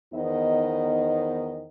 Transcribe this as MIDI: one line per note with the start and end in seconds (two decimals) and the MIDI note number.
0.13 1.68 40
0.13 1.68 51
0.13 1.68 59
0.13 1.68 63
0.13 1.68 72
0.13 1.68 75